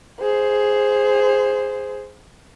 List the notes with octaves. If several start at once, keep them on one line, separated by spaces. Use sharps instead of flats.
G#4 C5